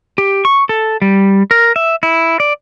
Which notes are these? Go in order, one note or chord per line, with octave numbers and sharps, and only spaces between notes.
G4
C#6
A4
G3
A#4
E5
E4
D5